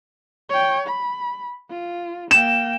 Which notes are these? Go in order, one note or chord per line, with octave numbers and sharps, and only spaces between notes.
C#5 G5
B5
F4
A#3 G5 E7